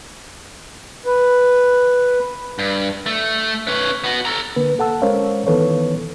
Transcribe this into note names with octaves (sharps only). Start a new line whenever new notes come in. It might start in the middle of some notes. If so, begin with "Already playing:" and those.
B4
G2
A3
C#4 B4
B3 F#4
A4 A#5
D3 A#3 B4
A4 F#5 A5 E6
G#3 C#4 A#4 C5 C#5 F5
D#3 E3 B3 A4 B4 C#5